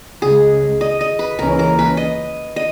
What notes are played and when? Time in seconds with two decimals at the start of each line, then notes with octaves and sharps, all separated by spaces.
0.22 C#2 C#3 G#3 G#4
0.81 D#5
1.01 D#5
1.19 B4
1.38 C#2 C#3 E3 A#3 C#4 A#4
1.59 A#4
1.79 B4
1.97 D#5
2.56 D#5